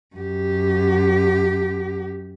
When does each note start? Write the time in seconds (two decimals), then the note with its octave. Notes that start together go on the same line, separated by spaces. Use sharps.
0.16 F#2 G4